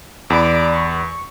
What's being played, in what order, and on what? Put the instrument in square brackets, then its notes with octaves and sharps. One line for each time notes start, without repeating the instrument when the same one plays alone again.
[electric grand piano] E2 B5 [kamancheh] D5 D6
[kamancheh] C#6